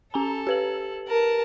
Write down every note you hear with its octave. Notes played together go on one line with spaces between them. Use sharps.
C#4 A4 G#5 A#5
G4 B4 F#7
A#4 A5